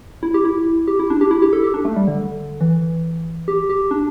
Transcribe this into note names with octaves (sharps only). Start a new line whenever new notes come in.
E4
G4
E4
G4
E4
D4
G4
E4
G4
A4
G4
D4
A3
G3
D3
E3
G4
G4
D4